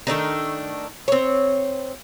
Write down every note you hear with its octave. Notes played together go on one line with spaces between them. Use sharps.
D#3 A3 D4 D#4
C4 C#5